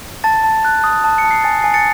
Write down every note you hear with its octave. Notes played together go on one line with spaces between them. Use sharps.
A5 A6
A5
F#6
D#6
A5
C#7
A5
C7
G#5 A6
G#5 C7
A6 C#7